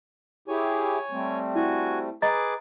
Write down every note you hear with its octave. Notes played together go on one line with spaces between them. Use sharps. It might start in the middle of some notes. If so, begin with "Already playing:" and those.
E4 G4 G#4 C#5 G#5
G3 A3 C4
E4 F#4 G#5
G#4 B4 D#5 A#5 D6 A6